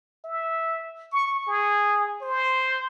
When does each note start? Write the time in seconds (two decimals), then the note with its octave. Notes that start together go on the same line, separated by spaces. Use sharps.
0.25 E5
1.12 C#6
1.48 G#4
2.22 C5